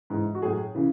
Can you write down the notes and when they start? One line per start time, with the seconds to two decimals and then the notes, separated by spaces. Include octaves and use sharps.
0.10 G#2 E3
0.35 F#4
0.42 A2 F#3 G#4
0.75 C#3 E3